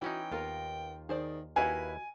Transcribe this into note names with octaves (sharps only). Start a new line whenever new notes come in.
E3 C#4 D#4 E4 F#4 G5
D#2 A#3 B3 F4 A#4
D#3 G#4 C5 D5
D#2 E4 F#4 B4 D#5 F5 F#5 G#5